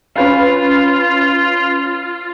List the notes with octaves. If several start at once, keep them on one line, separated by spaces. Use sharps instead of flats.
C#4 F4 B4 F5